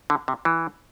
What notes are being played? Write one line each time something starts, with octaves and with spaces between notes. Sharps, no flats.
D3
C3
E3